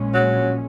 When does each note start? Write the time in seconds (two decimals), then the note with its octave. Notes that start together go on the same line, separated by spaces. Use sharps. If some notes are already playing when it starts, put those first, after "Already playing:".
Already playing: A#1 A#2 G#3 C#4
0.14 F#3